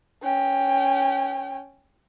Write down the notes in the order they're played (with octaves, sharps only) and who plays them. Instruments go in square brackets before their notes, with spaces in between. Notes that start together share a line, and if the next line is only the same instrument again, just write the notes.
[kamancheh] C#4 G5